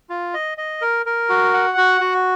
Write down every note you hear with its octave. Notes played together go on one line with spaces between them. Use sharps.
F4
D#5
D#5
A#4
A#4
F#4
F#5
F#4
F#4